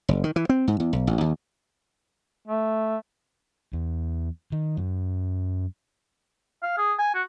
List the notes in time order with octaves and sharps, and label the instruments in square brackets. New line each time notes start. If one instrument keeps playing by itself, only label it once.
[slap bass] F#1
D#3
E3
C4
G#2
E2
B1
A1
D#2
[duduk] A3
[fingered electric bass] E2
D#3
F#2
[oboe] F5
G#4
G#5
F#4